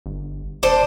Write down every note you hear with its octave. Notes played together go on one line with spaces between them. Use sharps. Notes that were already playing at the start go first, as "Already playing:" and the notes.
G1
E1 D4 A4 C5